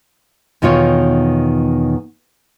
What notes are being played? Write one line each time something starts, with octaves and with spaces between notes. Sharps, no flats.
E2 B2 D#3 F4 C#5